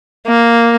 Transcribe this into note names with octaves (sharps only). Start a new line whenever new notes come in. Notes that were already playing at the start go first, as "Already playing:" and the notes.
A#3